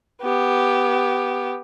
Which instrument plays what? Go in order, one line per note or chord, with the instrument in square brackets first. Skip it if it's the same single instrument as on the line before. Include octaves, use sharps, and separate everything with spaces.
[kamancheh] B3 G4